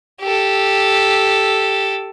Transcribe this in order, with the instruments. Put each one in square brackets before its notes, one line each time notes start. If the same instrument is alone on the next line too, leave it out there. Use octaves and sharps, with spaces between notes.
[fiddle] G4 A4